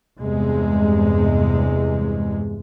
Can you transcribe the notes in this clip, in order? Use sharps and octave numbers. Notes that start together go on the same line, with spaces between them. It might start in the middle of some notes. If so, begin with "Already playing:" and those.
E2 G2 C3 G#3